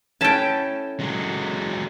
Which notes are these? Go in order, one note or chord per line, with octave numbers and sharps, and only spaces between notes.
C#4 E4 A4 G5 A5
F#3 G#3